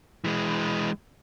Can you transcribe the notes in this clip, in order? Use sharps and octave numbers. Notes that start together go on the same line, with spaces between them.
E3 G#3